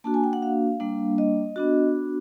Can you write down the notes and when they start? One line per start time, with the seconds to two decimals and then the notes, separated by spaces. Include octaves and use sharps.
0.04 A#3 D4 F#4 A5
0.14 G#5
0.24 G5
0.33 F#5
0.42 F5
0.80 G3 A#3 D4
1.18 D#5
1.56 B3 D4 F#4